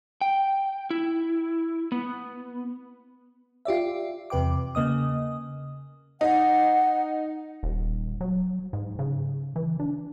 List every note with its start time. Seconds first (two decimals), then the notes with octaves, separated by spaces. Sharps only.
0.21 G5
0.90 E4
1.92 B3
3.65 F4 G4 D5 E5
4.30 E2 C3 B4 G5 D6
4.75 C#3 A#3 D#5 D#6
6.21 D#4 F#5
7.63 D#1
8.21 F#3
8.73 G#2
8.99 C#3
9.56 E3
9.80 D4